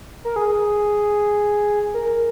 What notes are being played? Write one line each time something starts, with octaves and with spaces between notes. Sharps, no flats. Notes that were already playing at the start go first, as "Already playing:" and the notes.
A#4
G#4
A#4